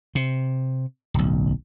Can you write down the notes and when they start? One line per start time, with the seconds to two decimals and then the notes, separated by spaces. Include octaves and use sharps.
0.15 C3
1.14 D1 B1